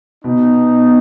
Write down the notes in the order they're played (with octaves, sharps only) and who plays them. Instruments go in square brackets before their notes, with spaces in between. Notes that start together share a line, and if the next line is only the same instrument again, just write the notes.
[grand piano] B2 [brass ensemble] B3 D#4